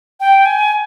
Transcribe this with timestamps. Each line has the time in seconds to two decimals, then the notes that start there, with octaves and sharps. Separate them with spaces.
0.20 G5
0.46 G#5